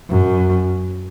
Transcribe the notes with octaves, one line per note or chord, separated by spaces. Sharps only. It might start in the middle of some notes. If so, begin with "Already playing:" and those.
F#2